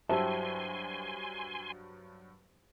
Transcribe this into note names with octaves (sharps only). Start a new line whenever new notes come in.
G2 F#3 G4 C5 E5 G#5 A5 C6